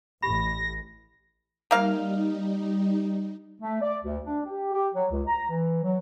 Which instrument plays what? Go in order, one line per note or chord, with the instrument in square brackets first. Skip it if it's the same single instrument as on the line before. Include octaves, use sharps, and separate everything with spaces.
[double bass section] A1 [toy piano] G4 B5 [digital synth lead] A#6
[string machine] G3 D#4 [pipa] A#3 F5
[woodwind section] A3
D5
D2
D4
G4
G4
F#3
C#2
A#5
E3
F#3